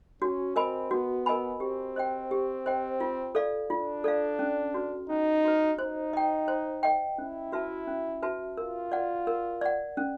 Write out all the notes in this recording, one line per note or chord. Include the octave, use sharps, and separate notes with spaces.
C#4 F#4
C4 A#4 D#5 G#5 B5
B3 F#4
A#4 D#5 G#5 B5
C4 G4
C5 D#5 G5
G4
C5 D#5 G5
F4
A4 D5 F5
D4 F4
A4 D5 F5
C#4
F#4 B4
C#4 D#4
F#4 B4
D#4 C5
D#5 G5
C5
D#5 G5
C#4 E4
F#4 B4 E5 A5
C#4
F#4 B4 E5 A5
F4 A#4
D5 F#5
A#4
D5 F#5
C#4